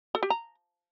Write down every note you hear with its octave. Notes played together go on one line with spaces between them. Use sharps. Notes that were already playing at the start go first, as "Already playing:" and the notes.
A4
G4
A#5